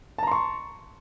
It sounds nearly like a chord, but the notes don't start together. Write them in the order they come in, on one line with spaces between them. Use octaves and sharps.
A5 A#5 C6 C#6